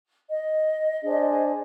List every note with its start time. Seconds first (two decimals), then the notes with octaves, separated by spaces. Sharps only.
0.29 D#5
1.02 D4 G#4 C5